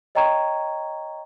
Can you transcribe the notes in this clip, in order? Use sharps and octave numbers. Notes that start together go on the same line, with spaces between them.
C#5 D#5 G5 A#5 C#6 G#6